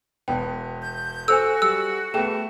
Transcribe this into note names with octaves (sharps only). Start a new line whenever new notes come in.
E1 B3 G5
G6
F#4 A4 C5 G#5 E6
G3 E6
A3 B3 G#4 G5 E7